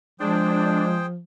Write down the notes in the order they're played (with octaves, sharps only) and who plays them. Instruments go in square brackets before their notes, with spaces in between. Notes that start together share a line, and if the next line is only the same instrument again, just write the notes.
[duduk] F3 [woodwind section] G#3 [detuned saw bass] D4 [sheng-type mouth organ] G#4 C5 G5